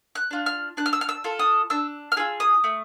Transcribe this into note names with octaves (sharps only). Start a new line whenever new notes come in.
F#6
D4 F4
F6
D4 F#6
F6
E6
F6
E6
F4 A4
D#6
D4 E6
F6
F4 G#4 E6
D#6
A3